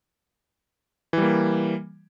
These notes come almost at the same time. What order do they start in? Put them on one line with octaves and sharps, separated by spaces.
E3 G3 A#3